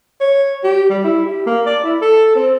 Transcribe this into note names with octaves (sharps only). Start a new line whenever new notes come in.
C#5
G4
G3
E4
G4
A#3
D5
E4
A4
C4